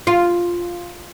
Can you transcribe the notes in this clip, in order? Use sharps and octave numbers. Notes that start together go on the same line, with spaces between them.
F4